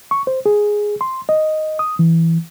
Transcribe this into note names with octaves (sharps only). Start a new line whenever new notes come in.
C#6
C5
G#4
C6
D#5
D#6
E3